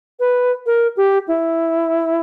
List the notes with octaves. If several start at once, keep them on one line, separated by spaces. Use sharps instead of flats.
B4
A#4
G4
E4